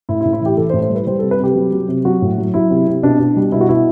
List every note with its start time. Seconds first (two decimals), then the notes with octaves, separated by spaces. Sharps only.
0.09 A2 E4
0.21 E4
0.25 A2
0.33 E4
0.41 E3 G4
0.57 E3 A4
0.70 C5
0.73 A2
0.82 C5
0.90 G3
0.95 B4
1.07 G3 C5
1.19 A4
1.23 C3
1.31 B4
1.39 C3 G4
1.55 F#3
1.73 F#3
1.88 C3
2.05 F#3 F#4
2.22 A2
2.38 F#3
2.54 F#3 E4
2.70 C3
2.87 C3
3.03 B2 D4
3.19 B2
3.36 G3
3.52 B2 E4
3.61 F#4
3.69 B2 E4